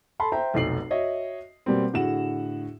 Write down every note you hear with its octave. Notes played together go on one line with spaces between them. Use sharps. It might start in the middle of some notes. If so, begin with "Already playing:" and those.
A4 A5 B5 C6
C5 E5 G5 A#5
F1 B1 D#4 C7 F#7
F#4 C#5 D#5 E5
B2 G3 A#3 C4
A2 D3 F#4 G#4 F#5 E7